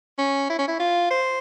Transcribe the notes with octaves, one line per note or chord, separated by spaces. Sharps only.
C#4
E4
C#4
E4
F4
C5